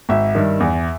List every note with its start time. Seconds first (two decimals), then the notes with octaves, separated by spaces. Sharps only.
0.09 G#1 E5
0.35 G2 D#3
0.60 E2